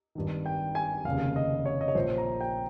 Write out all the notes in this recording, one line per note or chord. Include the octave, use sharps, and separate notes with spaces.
G#1 G2 D#3
G5
G#5
F1 D#2 C#3 F5
D#5
C#5
D#5
C#5
A#1 A#2 F3 C5
A#5
G5